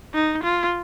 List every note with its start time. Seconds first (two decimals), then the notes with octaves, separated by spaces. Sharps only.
0.14 D#4
0.44 F4